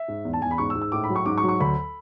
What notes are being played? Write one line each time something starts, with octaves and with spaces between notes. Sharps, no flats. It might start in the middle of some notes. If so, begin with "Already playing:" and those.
Already playing: E5
G#2
E2
A5
E2 G#5
B5
G#2 C#6
E6
G#2
E6
A2 D6
B5
F#3
C#6
G#2 D6
C#6
F#3
C#6
D2 B5